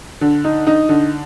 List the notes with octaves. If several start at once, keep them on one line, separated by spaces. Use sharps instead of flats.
D3
D#4
D#4
D3